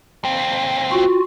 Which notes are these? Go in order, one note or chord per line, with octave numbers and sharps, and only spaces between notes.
D#2 C4
F4 F#4